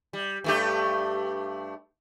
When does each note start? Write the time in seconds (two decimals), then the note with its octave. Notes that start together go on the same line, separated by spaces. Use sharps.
0.13 G3
0.44 G2 A3 G4